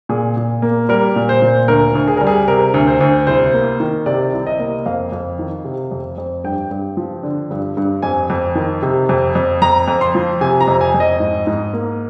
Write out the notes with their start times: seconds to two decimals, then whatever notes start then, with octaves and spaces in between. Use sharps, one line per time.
0.09 A#2 G#4
0.37 A#2
0.62 A#3
0.89 G3 A#4
1.16 A#2
1.29 C5
1.42 A#2
1.68 D2 A#4
1.95 D2
2.08 G#4
2.17 G3 A#4
2.27 G#4
2.48 C3 A#4
2.74 D2
2.87 C5
3.01 D2
3.27 C2 C5
3.54 A#3
3.80 D#3
4.06 C3 D5
4.33 C2
4.47 D#5
4.59 A#3
4.86 F2 F5
5.12 F2
5.39 D#3
5.65 C3
5.91 F2
6.18 F2
6.44 G2 G5
6.71 G2
6.97 F3
7.23 D3
7.50 G2
7.77 G2
8.02 F2 G#5
8.30 F2
8.55 D#3
8.82 C3
9.09 F2
9.35 F2
9.62 F2 A#5
9.88 F2
10.01 C6
10.15 F3
10.41 C3 G#5
10.61 A#5
10.68 F2
10.81 G#5
10.94 F2
11.00 D#5
11.20 G#2
11.47 G#2
11.73 A#3